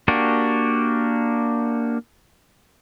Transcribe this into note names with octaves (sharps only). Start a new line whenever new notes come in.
A#3 D4 F#4 G4